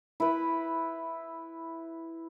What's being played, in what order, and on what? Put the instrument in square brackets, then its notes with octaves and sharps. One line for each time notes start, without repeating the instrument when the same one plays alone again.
[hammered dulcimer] E4 B4